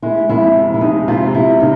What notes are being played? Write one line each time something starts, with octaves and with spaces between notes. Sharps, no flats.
G#3 E4
F2 E4
C3
E4
G#3 D#4
C3 F4
C3 E4
C#3 D#4